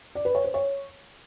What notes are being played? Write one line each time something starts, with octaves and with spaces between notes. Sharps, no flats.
D5
B4
C#5
C5
C#5